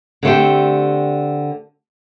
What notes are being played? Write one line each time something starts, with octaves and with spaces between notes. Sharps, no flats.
D3 A3 C4 G4